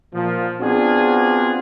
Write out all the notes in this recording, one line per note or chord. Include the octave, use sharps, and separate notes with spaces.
A#2 F3
B3 C4 D4 F4 F#4 G#4